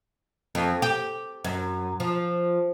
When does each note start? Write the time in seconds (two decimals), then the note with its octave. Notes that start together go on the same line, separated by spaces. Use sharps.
0.55 F2
0.82 G4
1.45 F#2
2.00 F3